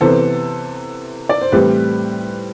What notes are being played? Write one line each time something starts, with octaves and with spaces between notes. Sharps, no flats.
C3 E3 B3 A4 C5
D5
C5
A2 E3 G3 C4 G4 B4